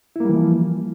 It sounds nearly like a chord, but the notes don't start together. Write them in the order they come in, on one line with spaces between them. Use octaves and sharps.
E4 A#3 G3 E3 F3